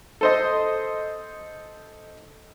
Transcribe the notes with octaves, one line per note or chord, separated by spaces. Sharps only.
A4 C5 D#5